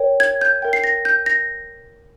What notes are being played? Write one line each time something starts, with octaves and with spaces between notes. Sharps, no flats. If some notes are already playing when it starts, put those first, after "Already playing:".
Already playing: A#4 C#5 G5
G#6
G6
A#4 E5 G5
C7
A#6
G6
A#6